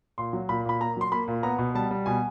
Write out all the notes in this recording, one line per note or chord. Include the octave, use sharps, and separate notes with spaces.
A#2 C6
F#3
A#2 B5
A#2 B5
A#3 A#5
F#3 C6
A#3 B5
A#2
B3 A#5
B2
G3 A5
G3
B2 G#5